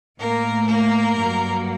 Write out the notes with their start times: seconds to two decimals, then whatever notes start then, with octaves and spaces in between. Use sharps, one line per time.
0.19 A2 A3 A#3 A#4
0.66 A#3 A#4
1.14 G2 F#3 A#3